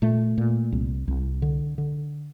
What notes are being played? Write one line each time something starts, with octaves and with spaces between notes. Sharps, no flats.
A#2 A3
A#2
C2
C2
D3
D3